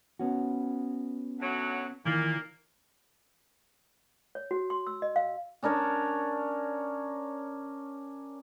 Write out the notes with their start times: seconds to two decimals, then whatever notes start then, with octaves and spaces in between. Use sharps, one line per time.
0.19 B3 C#4 F#4
1.40 D2 F#3
2.05 A#2 D#3 E3 A#3
4.35 C#5
4.51 F#4
4.70 C6
4.87 E6
5.02 D#5
5.16 F5
5.63 C#4 D4 A#4 C#5